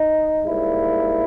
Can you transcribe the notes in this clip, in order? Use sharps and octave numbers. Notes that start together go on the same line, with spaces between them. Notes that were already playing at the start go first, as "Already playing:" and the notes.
Already playing: D#4
G#2 G3 A#3 E4